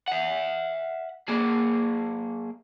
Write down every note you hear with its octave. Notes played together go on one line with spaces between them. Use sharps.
E5 F#5
A#3 G#4